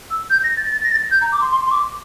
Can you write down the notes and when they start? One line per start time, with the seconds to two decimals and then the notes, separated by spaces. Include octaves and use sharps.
0.10 E6
0.30 G6
0.43 A#6
0.57 A6
0.71 A6
0.84 A#6
0.91 A6
1.11 G6
1.21 A#5
1.32 D6
1.41 C6
1.51 C6
1.66 C6
1.71 D6